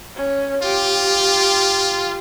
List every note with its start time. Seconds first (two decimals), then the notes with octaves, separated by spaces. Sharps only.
0.16 C#4
0.63 F4 G4